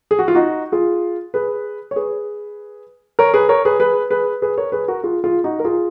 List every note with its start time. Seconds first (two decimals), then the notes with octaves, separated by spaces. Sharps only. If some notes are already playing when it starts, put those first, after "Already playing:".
0.11 G#4
0.19 F#4
0.28 F4
0.35 D#4 F#4
0.72 F4 G#4
1.34 G#4 B4
1.91 C#5
1.96 G#4 B4
3.19 A#4 C#5
3.34 G#4 B4
3.49 A#4 C#5
3.65 G#4 B4
3.80 G#4 B4
4.11 G#4 B4
4.42 G#4 B4
4.58 A#4 C#5
4.72 G#4 B4
4.88 F#4 A#4
5.03 F4 G#4
5.24 F4 G#4
5.44 D#4 F#4
5.60 A#4
5.64 F4 G#4